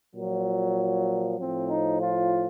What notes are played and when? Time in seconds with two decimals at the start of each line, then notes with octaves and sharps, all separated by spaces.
0.15 A#2 F3 F#3
1.38 A2 F3 C4
1.69 D#4
2.00 F4